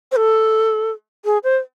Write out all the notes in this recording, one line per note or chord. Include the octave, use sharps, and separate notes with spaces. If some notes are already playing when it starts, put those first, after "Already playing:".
C5
A4
G#4
C5